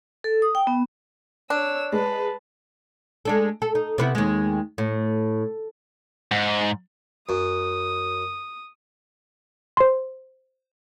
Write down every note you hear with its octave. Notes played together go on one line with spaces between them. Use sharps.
A4
D#6
G5
B3
D4 C#5 E6
G#3 B4 A5
G#3 D4 A4
A4
D#4
C3 B3 E4
D#2 G#3
A2
G#2
F#2 D#6
C5 C6